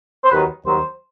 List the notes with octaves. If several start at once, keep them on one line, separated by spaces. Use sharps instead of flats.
C5
D#2 D#3 F#3 B4
D#2 D#3 F#3 C5